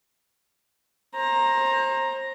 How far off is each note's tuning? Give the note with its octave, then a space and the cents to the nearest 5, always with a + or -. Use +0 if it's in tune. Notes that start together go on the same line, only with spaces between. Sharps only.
C5 +30 A#5 +0